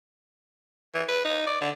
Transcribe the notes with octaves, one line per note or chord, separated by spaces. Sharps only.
E3
B4
D#4
D5
D3